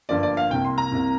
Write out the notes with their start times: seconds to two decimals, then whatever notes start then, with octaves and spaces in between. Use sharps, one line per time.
0.09 G1 G2 F3 A#3 D5
0.23 D5
0.37 F5
0.50 C2 C3 A#3 G5
0.65 C6
0.78 A#5
0.92 C2 C3 A#3